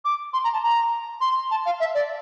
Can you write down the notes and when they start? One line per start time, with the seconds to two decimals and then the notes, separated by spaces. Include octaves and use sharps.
0.05 D6
0.33 C6
0.44 A#5
0.53 A5
0.63 A#5
1.21 C6
1.51 A5
1.66 F5
1.80 E5
1.95 D5